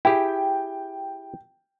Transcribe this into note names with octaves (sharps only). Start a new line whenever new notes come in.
E4 G4 G#4 G5